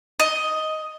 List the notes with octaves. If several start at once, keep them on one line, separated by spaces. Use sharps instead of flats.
D#5